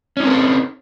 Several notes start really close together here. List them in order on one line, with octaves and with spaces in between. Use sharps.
C#4 D#4 C4 A#4 A4